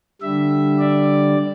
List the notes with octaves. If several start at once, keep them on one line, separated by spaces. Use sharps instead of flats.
D3 G3 E5
D5